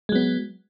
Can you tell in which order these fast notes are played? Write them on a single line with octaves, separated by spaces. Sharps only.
G#3 F#3 B3